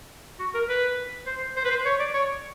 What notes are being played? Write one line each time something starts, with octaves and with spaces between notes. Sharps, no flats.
F#4
A#4
B4
C5
C5
B4
C5
C#5
D5
C#5